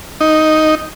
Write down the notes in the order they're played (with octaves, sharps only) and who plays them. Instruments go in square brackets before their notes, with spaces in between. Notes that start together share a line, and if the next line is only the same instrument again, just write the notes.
[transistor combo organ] D#4